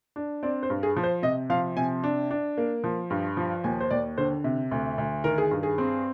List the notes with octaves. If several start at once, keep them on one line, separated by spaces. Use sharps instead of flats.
D4
C4 D5
C5
G2
G#4
F3
C5
C3 D#5
F3 F5
C3 G#5
D4
D4
A#3
F3
G2
F3
D#2 G#5
C5
D#2 D5
D3 C5
C3
D2
D2
D#3 A#4
G#4
G2
G#4
C4